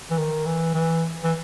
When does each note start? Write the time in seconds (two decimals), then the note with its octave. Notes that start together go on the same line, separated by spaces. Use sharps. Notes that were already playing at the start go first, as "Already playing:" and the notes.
0.11 E3
0.17 D#3
0.46 E3
0.74 E3
1.24 E3